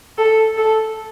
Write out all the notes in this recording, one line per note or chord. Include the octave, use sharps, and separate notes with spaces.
A4
A4